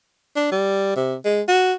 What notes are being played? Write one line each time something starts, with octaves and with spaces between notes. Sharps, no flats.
D4
G3
C3
G#3
F#4